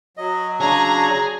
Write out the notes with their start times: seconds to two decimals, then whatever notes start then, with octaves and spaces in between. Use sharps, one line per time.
0.17 F#3 D#5
0.61 C#3 D4 G#4 C#5 A#5 A#6